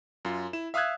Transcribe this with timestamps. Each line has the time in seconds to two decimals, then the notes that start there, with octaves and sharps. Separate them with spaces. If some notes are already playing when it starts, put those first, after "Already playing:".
0.25 F#2 F4
0.53 E4 E7
0.74 E5 F5 D#6 E6 F#6 G#6